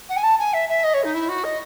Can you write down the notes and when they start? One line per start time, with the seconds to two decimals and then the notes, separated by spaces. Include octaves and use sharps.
0.09 F#5
0.16 G#5
0.23 A5
0.39 G#5
0.53 E5
0.69 E5
0.84 D#5
0.94 C#5
1.04 D#4
1.14 E4
1.28 F#4
1.44 D#5